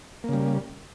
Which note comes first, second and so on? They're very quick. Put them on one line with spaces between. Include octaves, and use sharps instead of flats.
A#3 C#3 G3